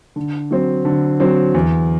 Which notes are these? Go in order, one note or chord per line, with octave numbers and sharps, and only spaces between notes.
D3
F#3 C4
D3
F#3 C4
E2